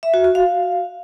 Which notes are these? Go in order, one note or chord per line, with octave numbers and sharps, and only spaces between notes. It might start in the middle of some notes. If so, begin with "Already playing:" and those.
E5
F#4
F#4
F5